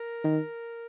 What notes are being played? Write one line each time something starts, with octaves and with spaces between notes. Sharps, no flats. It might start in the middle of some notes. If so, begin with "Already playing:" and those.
Already playing: A#4
D#3